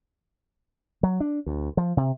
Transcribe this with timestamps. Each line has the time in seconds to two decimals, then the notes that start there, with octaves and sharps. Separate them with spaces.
1.03 F#3
1.20 D4
1.46 D2
1.77 F3
1.97 C3